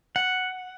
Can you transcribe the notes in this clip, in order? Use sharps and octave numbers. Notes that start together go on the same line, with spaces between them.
F#5